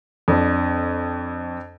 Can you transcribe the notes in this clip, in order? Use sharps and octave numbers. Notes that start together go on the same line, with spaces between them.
F2 D4